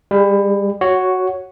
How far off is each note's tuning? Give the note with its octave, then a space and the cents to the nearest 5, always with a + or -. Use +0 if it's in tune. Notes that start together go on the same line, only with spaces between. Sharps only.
G3 +30 G#4 +0
F#4 +0 C#5 +0